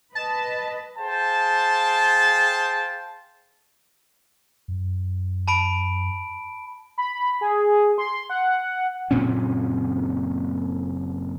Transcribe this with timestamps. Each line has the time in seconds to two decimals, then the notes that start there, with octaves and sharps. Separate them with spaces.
0.15 B4 D#5 A5
0.98 G#4 C5 F5 G5 A5
4.68 F#2
5.48 A5 B5 D7
6.98 B5
7.41 G#4
7.98 C6
8.30 F#5
9.11 F#1 A#2 C4 C#4